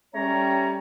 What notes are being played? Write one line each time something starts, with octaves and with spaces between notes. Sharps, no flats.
G3 A3 C#4 G4 C#5 A#5